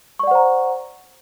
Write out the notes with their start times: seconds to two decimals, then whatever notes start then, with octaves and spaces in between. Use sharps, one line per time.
0.19 C#6
0.23 D5
0.27 F#5
0.31 C5
0.35 A#5